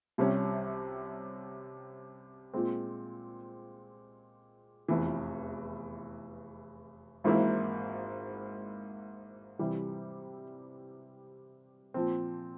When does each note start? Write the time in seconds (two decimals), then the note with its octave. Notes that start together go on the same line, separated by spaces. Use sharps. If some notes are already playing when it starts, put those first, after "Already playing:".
0.18 C2 C3 G3 C#4
2.54 A#2 G#3 C4
4.88 F1 E2 E3
7.24 G#1 G#2 E3 A#3 E4
9.59 C3 E3 G3
11.94 A#2 F3 C4